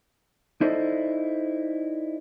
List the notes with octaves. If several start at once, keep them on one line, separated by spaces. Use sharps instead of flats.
D#4 E4 A4 C5 D5 D#5